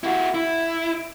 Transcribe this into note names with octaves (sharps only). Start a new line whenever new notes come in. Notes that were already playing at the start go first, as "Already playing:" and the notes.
E4 F#4
E4